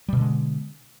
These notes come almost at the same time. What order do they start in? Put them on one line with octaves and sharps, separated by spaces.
G3 B2 D3 G#3